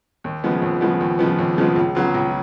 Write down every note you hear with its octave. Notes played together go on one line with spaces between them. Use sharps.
D#2
C#3 F3 G#3 B3
D#2
C#3 F3 G#3 B3
D#2
C#3 F3 G#3 B3
D#2
C#3 F3 G#3 B3
C#2
C#3 F#3 B3 F4
C#2